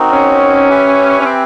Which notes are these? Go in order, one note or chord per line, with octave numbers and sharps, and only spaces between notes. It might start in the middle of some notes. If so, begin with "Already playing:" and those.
Already playing: C4 D#4 F#4 A#4
C#4
G4 B4 E5 G#5
C#4
C4